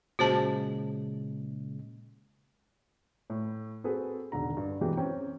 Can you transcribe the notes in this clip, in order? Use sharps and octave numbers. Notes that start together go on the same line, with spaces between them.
A#2 C#3 G#3 F#4 C5 A5
A2
C4 F#4 G#4 A4 B4
E1 B1 D3 A#5
G2
F#2 B2 E3 G#3 G4 G5
C4 C#4 G5